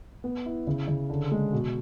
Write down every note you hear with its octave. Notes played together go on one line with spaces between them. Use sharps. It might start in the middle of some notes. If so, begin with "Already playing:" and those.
B3
E4
C#3
C#3
D3
G#3
B2